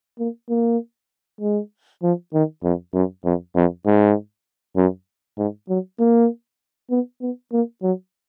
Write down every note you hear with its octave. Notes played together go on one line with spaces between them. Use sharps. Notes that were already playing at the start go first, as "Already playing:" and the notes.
A#3
A#3
G#3
F3
D#3
F2
F#2
F2
F2
G#2
F#2
G#2
F#3
A#3
B3
B3
A#3
F#3